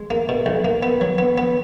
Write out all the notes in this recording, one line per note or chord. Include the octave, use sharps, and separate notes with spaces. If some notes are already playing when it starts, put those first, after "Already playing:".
Already playing: G#3
A#3
B2
B1
A#3
B3
F#3
B3
B3